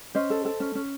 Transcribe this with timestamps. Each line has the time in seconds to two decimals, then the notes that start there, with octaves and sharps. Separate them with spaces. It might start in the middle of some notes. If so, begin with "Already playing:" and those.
0.15 C#4 C5 D#5
0.30 A4
0.45 A4
0.60 C#4
0.75 C#4